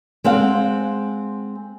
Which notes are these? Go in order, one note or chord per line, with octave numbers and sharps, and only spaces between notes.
G#3 C4 F5 F#5